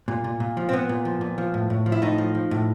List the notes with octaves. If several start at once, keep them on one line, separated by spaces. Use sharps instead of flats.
A#2
A#2
A#2
F3
C4
A#2 B3
A#2
F3
A#2
F3
A2
A2
F3
E4
A2 D#4
F3
F3
A2